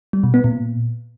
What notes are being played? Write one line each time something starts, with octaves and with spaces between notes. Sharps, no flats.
G3
B2
B3
A#2